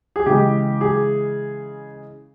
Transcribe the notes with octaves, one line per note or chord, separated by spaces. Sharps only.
G#4
C#3 E3 G#3 G4
G#4